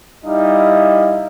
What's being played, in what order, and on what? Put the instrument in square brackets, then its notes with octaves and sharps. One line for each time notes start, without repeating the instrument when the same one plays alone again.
[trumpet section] G3 D#4 E4 D#5 F5